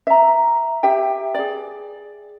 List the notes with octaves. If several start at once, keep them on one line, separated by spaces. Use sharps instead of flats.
E5 A#5
G4 E5 G5
G#4 D5